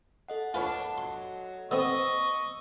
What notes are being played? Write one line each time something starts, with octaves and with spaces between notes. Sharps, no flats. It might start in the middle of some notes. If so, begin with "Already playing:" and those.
A4 D#5 F#5
D4 F4 B4 C#5
F#3 C6
D3 B3 C4 D#5 C#6 D#6 E6